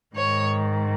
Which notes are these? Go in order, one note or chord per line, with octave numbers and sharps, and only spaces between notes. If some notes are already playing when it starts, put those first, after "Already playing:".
G#2 D#3 C#5